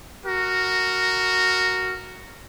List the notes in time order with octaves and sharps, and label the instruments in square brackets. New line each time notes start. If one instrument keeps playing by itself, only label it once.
[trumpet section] F#4 A#4